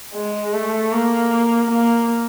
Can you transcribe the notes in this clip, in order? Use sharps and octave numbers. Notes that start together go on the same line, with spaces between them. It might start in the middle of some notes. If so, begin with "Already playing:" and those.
G#3
A3
A#3
A#3